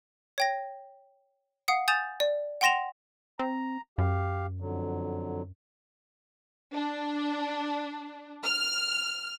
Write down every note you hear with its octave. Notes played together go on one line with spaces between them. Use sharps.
C#5 G5 A#6
F5 F#5 D#6 C7
G#5 D#6 G6 A6 E7 F7
D5
F#5 G5 C6 A#6 E7 F7
C4 A#5
F#2 G4 F5
F2 D3 F#3
D4
F6